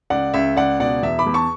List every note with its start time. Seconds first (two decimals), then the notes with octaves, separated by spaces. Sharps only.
0.10 C#2 D5 F#5
0.34 C#2 E5
0.57 C#2 D5 F#5
0.80 B2 D5 F#5
1.03 E2 E5
1.19 B5 D6
1.26 E2
1.34 A5 C#6